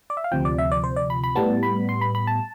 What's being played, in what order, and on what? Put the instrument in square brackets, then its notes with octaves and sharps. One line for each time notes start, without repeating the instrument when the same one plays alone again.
[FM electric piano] D5
E5
F5
D2 C3 F3 G5
D5
E5
D5
C5
D5
B5
B5
A2 G3 B3 A5
B5
C6
B5
B5
A5